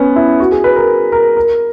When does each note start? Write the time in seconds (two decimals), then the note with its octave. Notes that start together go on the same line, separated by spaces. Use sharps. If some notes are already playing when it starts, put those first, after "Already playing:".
Already playing: B3 C#4
0.16 E4
0.40 F#4
0.52 G#4
0.64 B4
0.76 A#4
1.12 A#4
1.37 A#4